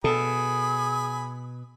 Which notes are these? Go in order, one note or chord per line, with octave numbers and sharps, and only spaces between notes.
B2 G#4 A4 G#5 B5 D#6